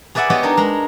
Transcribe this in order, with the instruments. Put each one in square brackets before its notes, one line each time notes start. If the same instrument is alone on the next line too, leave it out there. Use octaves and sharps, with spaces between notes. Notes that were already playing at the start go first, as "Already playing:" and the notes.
[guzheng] G#4 B4 D5 E5 F#5 G#5
B3 G4 B4 C#5 D#5
D4 D#4 G#4 A#4 B4
G#3 A#4 A#5